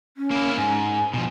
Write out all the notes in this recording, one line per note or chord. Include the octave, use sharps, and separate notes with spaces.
C#4
A#3 E4
G#2 G#5
B2 F3